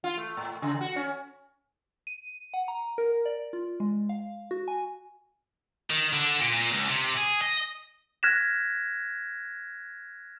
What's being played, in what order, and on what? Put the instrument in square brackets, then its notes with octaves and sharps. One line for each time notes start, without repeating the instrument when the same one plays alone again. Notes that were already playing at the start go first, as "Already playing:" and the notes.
[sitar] F4
A3
A2
C#3
F#4
C#4
[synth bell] D#7
F#5
A#5
A#4
D5
F4
G#3
F5
F#4
G#5
[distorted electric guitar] D#3
D3
A#2
A#2
C#2
C3
G#4
D#5
[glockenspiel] F6 F#6 G#6 A#6 B6 E7